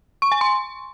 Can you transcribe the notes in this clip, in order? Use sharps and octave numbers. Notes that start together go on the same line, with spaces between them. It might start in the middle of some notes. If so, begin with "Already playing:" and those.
C#6
G#5
C6